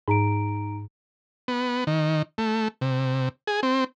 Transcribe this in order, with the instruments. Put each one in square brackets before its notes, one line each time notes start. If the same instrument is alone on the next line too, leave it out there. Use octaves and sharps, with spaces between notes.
[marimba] G#2 [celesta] D#4 A#5 D7
[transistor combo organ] B3
D#3
A3
C3
G#4
C4